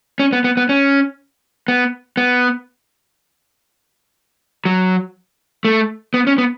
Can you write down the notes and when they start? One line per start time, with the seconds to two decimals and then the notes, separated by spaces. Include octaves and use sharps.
0.20 C#4
0.33 B3
0.44 B3
0.57 B3
0.69 C#4
1.68 B3
2.17 B3
4.65 F#3
5.65 A3
6.14 B3
6.27 C#4
6.38 B3